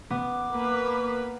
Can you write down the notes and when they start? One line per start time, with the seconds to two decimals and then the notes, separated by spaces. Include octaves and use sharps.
0.10 B3 D6
0.51 A#3 B4